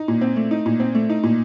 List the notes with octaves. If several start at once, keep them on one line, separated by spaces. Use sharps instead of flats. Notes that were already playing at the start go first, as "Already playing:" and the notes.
Already playing: D#4
A#2
C4
A3
D#4
A#2
C4
A3
D#4
A#2